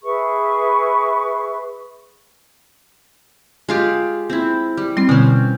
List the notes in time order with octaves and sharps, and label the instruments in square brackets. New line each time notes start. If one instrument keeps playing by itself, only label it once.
[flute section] G#4 B4 E5 C#6
[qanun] G#3 F4 G4
C4 E4
G3
[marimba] G3 C4 [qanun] C6
[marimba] B2 D3 [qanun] C4 C#4